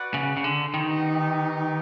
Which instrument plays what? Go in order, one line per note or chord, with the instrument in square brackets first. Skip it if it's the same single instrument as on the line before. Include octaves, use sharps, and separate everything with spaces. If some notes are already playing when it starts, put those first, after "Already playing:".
Already playing: [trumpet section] F#4 B4 D5 F#5
[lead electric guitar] C#3
C#3
D3
[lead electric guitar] D#3 [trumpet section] B3 D#4 G4